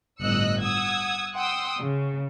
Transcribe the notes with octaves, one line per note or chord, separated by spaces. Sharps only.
G1 A2 D#5 E6 F#6 C#7
F#5 D#6 E6 G#6
F#5 G5 C6 D#6 E6
C#3